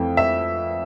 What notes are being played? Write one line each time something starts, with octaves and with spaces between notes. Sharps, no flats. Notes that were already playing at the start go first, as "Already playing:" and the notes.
Already playing: F2 E3 A3 G5
E5